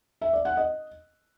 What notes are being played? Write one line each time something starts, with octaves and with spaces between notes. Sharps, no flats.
E5
D5
F#5
D#5